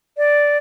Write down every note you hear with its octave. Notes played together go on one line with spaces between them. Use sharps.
D5